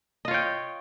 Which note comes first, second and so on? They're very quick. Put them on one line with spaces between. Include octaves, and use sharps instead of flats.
D#5 F4 C#5 G5